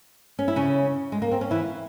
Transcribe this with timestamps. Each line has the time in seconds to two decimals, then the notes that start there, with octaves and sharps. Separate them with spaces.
0.39 C#4
0.48 E4
0.56 C#3 C#4
1.12 G#3
1.22 A#3
1.32 C4
1.41 C#4
1.51 E3 E4